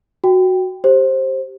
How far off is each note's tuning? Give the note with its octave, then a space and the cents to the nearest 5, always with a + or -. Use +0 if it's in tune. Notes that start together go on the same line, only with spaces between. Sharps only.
F#4 +0 G5 +0
G4 +0 C5 +15